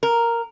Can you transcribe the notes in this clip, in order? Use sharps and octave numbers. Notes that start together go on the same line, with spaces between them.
A#4